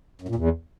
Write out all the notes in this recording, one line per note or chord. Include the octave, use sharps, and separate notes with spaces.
F#2
A#2
E2